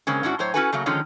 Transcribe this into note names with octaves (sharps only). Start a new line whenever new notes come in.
C#3 G#3 A#3 C4 C#4
G#2 C#4 D4 E4 F#4
A2 F#3 C5 C#5
C#4 E4 F#4 A4 B4 G#5
C#3 F#3 A3 A#3
D3 D#3 F3 G#3 C#4 D#4